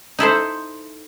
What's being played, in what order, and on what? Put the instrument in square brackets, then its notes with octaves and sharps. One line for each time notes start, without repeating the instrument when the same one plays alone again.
[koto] D#4 E4 A4 C5